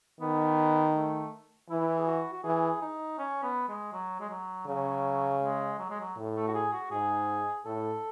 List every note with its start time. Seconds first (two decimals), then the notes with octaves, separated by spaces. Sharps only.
0.20 D#3 B3
0.95 A3
1.69 E3 E4
1.98 G#4
2.07 F#4
2.33 F#4
2.44 E3 G#4
2.81 D#4
3.18 C#4
3.43 B3
3.69 G#3
3.93 F#3
4.20 G#3
4.30 F#3
4.67 C#3 F#3
5.43 G#3
5.79 F#3
5.90 G#3
6.00 F#3
6.17 A2
6.36 A3
6.48 F#4
6.54 G#4
6.73 F#4
6.90 G#2 G#4
7.65 A2 A4